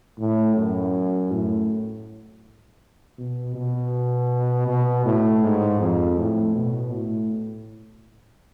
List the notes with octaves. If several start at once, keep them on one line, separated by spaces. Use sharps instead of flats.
A2
F#2
A2
B2
B2
B2
A2
G#2
F2
A2
B2
A2